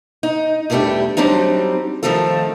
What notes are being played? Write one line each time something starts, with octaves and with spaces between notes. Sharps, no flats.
D#4
E2 E3 G3 A3 D4 G4
F#3 G3 C4 D4 D#4
D#3 F3 A3 C4 F4 A4